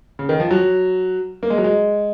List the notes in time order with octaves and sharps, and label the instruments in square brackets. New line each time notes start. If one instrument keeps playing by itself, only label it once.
[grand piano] C#3
D#3
F3
F#3
A#3
G#3
F#3
G#3